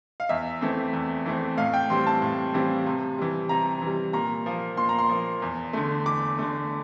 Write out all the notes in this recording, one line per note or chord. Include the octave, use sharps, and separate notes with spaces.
F5
E2 E5
E3 A3 C4
E2
E3 A3 C4
A2 F5
G5
E3 G3 C4 C6
A5
A2
E3 G3 C4
C3
E3 G3
C3 A#5
E3
G3
A#2 A#5
F3 A#3
A#2 C6
A#5
C6
F3 A#3
E2
D3 A3
E2 D6
D3 A3